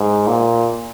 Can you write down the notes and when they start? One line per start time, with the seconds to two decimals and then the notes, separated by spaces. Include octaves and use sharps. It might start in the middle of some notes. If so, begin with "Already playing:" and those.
Already playing: G#2
0.27 A#2